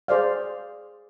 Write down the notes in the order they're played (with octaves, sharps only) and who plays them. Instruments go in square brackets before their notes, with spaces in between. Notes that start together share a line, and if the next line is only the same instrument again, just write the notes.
[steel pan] G#4 C5 D5 F5